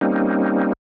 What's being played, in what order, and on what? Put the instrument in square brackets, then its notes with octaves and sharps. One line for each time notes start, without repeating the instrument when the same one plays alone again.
[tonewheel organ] G3 A#3 C4 C#4 D#4